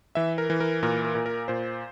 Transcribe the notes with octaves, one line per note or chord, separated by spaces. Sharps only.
E3 E5
A#4
E3
A#4
A#2 A#4
A#4
A#2
A#4
A#2 C5